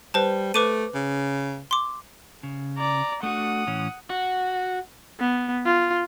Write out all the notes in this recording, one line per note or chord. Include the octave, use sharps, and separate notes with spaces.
G3 B4 C5 A5
A3 B4 D6 D#7
C#3
C6 D6
C#3
D5 A#5
A3 D4 F#4 F#5 D#6
A2 E3 C#4
F#4
B3
F4